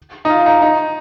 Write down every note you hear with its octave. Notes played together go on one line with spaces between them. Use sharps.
D#4
F4
D#4
D#4